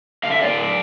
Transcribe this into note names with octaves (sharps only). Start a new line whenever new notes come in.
D3 F5
E5
D5 F5
D4